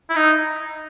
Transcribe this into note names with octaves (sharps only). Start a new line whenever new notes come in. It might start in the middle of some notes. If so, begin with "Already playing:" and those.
E4
D#4